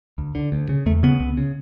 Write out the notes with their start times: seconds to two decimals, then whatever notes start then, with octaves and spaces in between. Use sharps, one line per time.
0.18 D2
0.35 D3
0.52 D2
0.69 C#3
0.86 E2 A3
1.03 C#3 B3
1.20 C#2
1.37 C#3